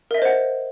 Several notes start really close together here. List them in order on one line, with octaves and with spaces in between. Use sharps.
A#4 E5 D#5 C5 F#5